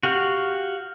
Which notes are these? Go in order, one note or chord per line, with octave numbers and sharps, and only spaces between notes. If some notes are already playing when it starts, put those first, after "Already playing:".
F#4 G4 F5 C#6